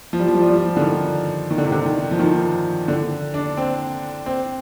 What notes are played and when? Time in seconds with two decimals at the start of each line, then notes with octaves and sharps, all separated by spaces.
0.13 F3
0.19 G3
0.28 F3
0.34 G3
0.42 F3
0.49 G3
0.56 F3
0.77 D3
0.81 D#3
1.51 D#3
1.58 D3
1.64 C3
1.72 D3
1.86 D#3
2.11 F3
2.19 D#3
2.88 D3
3.34 D4
3.57 C4
4.26 C4